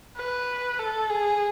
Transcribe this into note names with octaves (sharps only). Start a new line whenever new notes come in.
B4
A4
G#4